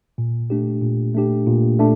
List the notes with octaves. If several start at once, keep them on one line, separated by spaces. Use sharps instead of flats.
A#2
A3 D4 G4
A#2
A3 D4 G4
A#2
A3 D4